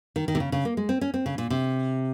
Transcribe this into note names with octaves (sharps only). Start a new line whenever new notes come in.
D#3
D#3
C3
C#3
C#3
A#3
G#3
C4
C#4
C4
C#3
A#2
C3